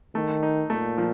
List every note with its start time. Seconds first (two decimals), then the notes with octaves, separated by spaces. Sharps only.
0.15 D#3 A3
0.43 D#4
0.70 A#2 A3
0.98 F3